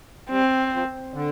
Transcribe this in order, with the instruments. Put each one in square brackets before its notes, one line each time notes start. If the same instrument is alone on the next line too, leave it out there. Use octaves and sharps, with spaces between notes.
[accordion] G3 [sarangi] C4
[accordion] F3
D3